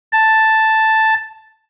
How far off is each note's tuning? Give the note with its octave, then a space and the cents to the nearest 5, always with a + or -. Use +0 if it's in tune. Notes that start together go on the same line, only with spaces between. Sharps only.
A5 +0